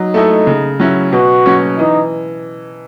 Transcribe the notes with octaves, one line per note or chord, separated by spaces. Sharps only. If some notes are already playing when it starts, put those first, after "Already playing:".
Already playing: F#3 D#4
A3 E4 A4 D#5
C#3
F#3 C#4 E4
B2 F#4
F#3 C#4
E3 D#4